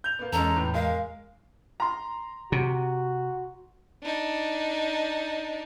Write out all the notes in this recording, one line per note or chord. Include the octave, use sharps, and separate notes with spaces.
G6 F7
A#3 B3
E2 G#3 C#4 A4 A#5
A2 B3
G#3 A#4 F5
A#5 C6
C3 F#4
D4 D#4